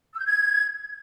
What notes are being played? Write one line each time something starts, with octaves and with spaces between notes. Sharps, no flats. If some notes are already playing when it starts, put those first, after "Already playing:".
E6
G6
G#6